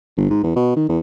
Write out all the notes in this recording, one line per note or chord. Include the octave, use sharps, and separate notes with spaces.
G1
G#2
E2
B2
D#3
E2